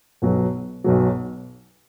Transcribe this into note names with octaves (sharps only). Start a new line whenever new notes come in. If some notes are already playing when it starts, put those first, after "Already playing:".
B1 B2 F#3
B1 B2 F#3